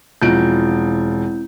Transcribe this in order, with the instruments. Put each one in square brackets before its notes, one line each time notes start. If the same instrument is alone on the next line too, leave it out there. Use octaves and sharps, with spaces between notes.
[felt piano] E1 F3 D7 [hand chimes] C4 E4 G6